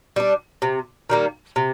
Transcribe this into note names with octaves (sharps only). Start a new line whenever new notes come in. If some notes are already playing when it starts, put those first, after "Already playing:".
G3 D4
C3
D#3 G3 A#3
C3